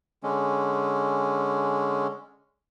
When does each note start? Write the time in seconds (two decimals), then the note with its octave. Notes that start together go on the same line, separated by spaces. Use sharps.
0.23 D3 G#3 C#4